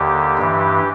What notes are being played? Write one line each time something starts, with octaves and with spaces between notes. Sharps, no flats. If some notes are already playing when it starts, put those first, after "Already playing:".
Already playing: D#2 D3 G4
G2 E3